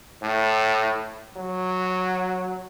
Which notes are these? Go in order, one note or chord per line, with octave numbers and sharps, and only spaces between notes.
A2
F#3